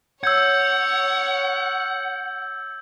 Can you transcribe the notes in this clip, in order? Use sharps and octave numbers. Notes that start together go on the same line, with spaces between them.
C#5 F#5 E6 G6 G#6